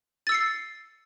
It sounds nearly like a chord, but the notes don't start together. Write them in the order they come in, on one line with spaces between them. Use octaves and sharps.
A6 E6 C#7 C7